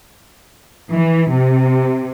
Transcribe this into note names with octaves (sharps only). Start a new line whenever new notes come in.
E3
C3